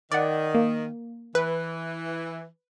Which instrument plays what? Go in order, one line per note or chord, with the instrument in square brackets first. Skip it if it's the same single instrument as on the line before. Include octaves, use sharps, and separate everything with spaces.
[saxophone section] D#3 [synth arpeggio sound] D5 F#5
[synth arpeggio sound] A#3
[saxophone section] E3 [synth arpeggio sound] B4